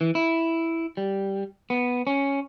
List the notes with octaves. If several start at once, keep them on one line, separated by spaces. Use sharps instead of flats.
E3
E4
G3
B3
C#4